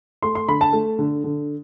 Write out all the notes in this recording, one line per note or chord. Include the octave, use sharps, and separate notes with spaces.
A3 C6
C6
D3 B5
A5
A3
D3
D3